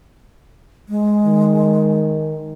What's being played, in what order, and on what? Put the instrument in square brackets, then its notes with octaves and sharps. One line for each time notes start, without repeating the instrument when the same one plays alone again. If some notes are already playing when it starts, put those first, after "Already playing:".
[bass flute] G#3
[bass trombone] D#3